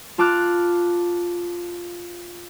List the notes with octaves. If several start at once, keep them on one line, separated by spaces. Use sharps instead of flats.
F4 A5 D6 F6 F#6